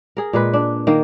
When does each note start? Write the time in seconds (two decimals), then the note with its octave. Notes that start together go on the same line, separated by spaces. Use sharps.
0.17 G#4 A#4
0.33 A#2 G#3 B4
0.53 D4
0.87 D#3 A#3